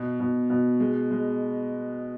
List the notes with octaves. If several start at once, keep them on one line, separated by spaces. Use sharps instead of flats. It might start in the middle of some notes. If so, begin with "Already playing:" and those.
Already playing: B2
B2
B2
G#3
G#3